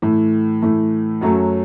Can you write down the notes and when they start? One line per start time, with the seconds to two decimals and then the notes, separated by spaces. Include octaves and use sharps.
0.02 A2 E3 A3
0.62 A2 E3 A3
1.21 F#2 F#3 A3 C#4 F#4